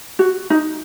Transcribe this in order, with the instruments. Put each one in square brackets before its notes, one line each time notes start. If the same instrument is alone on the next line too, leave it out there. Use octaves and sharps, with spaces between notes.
[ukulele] F#4
D#4